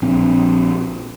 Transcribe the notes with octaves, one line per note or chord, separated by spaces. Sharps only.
A#1 C4